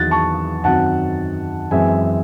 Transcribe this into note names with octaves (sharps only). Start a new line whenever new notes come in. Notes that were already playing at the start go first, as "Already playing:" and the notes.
Already playing: E2 D#3 F#3 F#6 A6
A5 C#6
F#2 D#3 F#3 C4 F#5 A5
F#2 E3 G#3 C4 E5 G#5